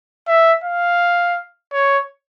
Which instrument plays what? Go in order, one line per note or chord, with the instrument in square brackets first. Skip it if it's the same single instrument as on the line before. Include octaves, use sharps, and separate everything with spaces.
[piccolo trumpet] E5
F5
C#5